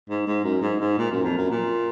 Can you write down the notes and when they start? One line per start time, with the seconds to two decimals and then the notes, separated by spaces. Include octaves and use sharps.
0.10 G#2
0.27 G#2
0.44 F#2
0.62 G#2
0.80 G#2
0.97 A#2
1.11 F#2
1.24 F2
1.37 F#2
1.50 A#2